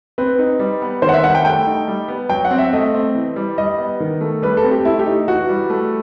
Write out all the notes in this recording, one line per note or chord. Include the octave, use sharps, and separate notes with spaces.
C4 B4
D#4
G3
B3
D#3 C5
F#5
E5
G3 F#5
G5
A3 G5
D#4
G3
B3
F#3 G5
F#5
C4
E5
A3 D#5
C4
E3
G3
G3 D#5
B3
D#3
A3
G3 B4
A4
C4
G4
A3 E4
G4
D#4
E3 F#4
G3
A3